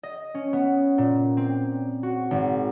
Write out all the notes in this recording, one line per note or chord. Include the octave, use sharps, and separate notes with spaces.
D#5
C#4
B3
A#2
C4
F#4
G#1